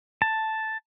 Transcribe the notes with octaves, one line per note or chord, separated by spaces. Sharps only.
A5